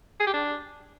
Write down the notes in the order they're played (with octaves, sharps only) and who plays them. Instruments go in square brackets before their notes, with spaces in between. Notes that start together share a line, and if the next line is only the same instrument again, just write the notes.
[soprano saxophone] G#4
G4
D4